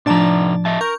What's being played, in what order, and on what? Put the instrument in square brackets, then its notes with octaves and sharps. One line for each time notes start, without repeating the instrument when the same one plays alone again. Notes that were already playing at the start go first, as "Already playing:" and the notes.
[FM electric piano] A2 F3 [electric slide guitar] C3 D#4 A#5 [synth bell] D4 D5 A5
[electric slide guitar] D#5 E5 A5
[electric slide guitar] A#4 [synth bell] C#6 G6